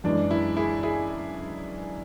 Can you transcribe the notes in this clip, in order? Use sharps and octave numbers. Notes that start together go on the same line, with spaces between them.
F#2 E3 G#3 D4
E4
E4 G#4
E4 G#4